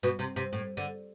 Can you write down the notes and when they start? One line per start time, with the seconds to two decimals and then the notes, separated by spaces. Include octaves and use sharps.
0.03 B2
0.19 C3
0.36 C3
0.53 A2
0.77 D3